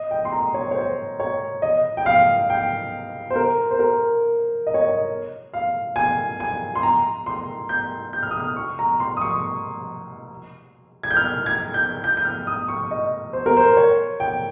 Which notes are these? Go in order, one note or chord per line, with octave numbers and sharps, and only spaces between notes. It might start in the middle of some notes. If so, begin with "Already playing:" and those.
Already playing: D#5
G5
C6
A#5
C#5
C#5
C5
C#5
D#5
G5
F5
G5
C5
A#4
C5
A#4
D#5
C#5
D#5
F5
G#5
G#5
C6
A#5
C6
G6
G6
F6
D#6
F6
C#6
A#5
C6
D#6
C#6
G#6
G6
F6
G#6
G6
G6
G6
F6
D#6
C#6
D#5
C5
A#4
C5
C#5
G5